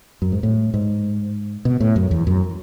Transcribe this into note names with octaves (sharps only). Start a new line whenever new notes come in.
F#2
G#2
A2
G#2
B2
A2
F#2
E2
F#2